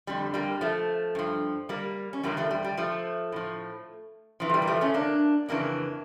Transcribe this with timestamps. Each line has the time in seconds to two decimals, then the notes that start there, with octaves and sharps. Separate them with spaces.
0.07 F2 D3 G3
0.34 G3 A#3
0.61 F3 A3
1.15 G2 F3
1.69 G3 A#3
2.13 C#4
2.23 E2 D3 F3 G3 A#3
2.37 F3 A3
2.51 G3
2.64 G3
2.77 F3 A3
3.32 A2 F3
4.40 F2 E3 F3
4.49 A3
4.54 G3
4.62 A#3
4.67 F3 A3
4.81 A3 C#4
4.94 A#3 D4
5.49 F2 C#3 E3 A#3 D4